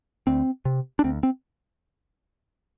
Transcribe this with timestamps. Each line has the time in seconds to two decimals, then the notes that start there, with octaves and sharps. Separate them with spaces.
0.27 D2 C4
0.65 C3
0.99 D4
1.04 D2 C4
1.23 C4